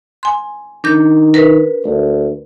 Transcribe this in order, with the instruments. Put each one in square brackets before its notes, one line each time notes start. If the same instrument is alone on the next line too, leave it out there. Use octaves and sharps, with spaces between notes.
[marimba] G#5 C6
[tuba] D#3 [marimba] D4 A#4 G6
[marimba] A#4 B4
[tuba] D2